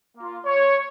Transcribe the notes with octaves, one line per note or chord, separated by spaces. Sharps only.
A#3 F4
C#5